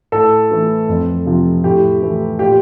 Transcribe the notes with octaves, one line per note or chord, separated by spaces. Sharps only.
A2 A4
E3 A3
F2
C3 F3
A2 G4
E3 A3
A#2 G4